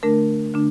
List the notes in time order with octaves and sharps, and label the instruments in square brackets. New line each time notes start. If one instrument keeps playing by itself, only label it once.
[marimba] D3 A3 D4 A#4
D3 A3 D4